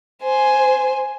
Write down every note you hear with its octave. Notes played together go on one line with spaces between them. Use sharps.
C5 G#5